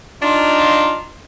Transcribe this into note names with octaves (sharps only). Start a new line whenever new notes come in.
D4 D#4 F4